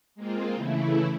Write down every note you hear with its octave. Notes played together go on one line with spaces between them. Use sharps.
G#3 A#3 C4 F4
C#3 E3 A3 E4